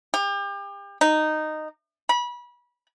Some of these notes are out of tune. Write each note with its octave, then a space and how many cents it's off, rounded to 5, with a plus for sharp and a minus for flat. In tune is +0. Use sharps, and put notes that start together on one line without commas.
G4 +35
D#4 -10
B5 -30